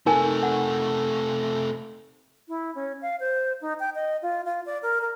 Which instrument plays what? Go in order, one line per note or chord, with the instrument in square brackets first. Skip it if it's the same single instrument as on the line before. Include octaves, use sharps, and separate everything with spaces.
[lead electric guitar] C3 A3 [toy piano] D#4 A#4 G#5
[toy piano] F#5
[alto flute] E4
C#4
F5
C5
D#4
G5
D#5
F4
F4
D5
A#4
A#4